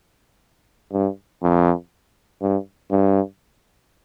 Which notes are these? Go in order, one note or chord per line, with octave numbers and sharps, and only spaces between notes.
G2
F2
G2
G2